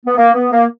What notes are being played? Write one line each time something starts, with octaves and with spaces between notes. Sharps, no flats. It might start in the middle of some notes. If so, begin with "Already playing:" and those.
B3
A#3
B3
A#3